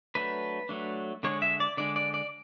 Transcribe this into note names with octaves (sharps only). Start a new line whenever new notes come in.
F#3 A3 D4 B4
F#3 A3 D4
D3 G#3 D4 C#5
E5
D5
D3 G#3 D4 D5
D5
D5